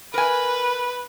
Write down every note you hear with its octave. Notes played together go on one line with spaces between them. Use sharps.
A#4 B4 G#5